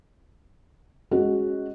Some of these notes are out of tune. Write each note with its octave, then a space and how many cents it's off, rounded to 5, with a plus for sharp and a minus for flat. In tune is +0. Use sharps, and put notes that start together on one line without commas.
G#3 +0 C#4 +0 F#4 +0